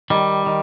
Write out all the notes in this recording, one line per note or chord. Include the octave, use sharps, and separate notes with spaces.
D#3 G3
D#3